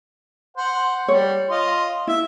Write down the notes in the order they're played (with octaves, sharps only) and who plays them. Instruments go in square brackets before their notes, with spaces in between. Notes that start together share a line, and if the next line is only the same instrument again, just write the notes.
[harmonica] C5 F#5
[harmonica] G3 [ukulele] C#5
[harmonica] F4 D#5 C6
[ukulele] E4 [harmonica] E5